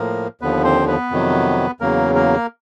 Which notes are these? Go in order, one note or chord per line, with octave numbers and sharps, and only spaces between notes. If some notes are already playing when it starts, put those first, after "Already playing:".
Already playing: A2 F3 A#3 A#4
D#2 D3 F3 B3 B4
C4 C5
B3 B4
F2 C3 D#3 F#3
E2 C#3 F#3 A#3 A#4
A#3 A#4